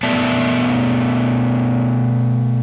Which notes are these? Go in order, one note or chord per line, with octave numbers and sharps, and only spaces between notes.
B2 A3 B3 D5 E5 A5